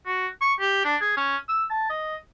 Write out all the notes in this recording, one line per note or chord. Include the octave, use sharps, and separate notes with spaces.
F#4
C#6
G4
D4
G#4
C#4
E6
A5
D#5